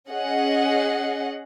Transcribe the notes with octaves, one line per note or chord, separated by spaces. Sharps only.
C#4 G#4 D#5 F#5